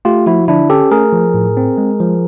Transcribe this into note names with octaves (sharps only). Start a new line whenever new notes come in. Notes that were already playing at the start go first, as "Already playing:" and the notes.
A3 F4 G4
F3 E4 F#4
D3 D4 E4
C#4 G4 A4
A3 G#4 A#4
F3
A2
C4
G#3
F3